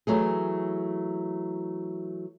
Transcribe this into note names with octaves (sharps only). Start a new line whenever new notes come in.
E3 F#3 A3 G#4